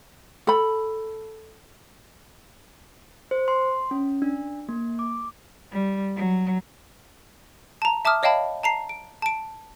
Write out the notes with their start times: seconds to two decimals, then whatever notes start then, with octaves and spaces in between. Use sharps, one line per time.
0.47 A4 B5
3.31 C5
3.48 C6
3.91 C#4
4.22 D4
4.69 A#3
4.99 D6
5.70 G3
6.15 F#3
7.82 A5 A#5
8.05 E5 A5 D6 D#6 F6
8.23 C#5 D#5 F5 G5 A5 B5
8.63 A5 A#5 C7
8.89 D7
9.22 A5 D7